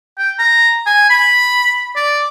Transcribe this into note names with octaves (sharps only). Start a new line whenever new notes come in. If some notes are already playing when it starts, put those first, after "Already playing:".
G5
A#5
G#5
B5
D5